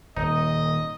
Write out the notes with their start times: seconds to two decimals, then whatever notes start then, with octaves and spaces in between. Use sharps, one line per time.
0.17 D#1 D#4 D#5